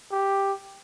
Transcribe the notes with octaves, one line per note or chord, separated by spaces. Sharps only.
G4